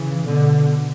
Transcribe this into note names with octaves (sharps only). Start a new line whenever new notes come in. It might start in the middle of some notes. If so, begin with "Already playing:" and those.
Already playing: C#3 E3
B2 D3